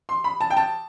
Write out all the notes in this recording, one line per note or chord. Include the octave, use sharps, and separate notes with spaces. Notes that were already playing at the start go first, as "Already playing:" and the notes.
C6
B5
A5
G5
A5